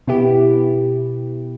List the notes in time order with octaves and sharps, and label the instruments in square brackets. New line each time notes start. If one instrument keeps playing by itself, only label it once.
[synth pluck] B2 B3 E4 G4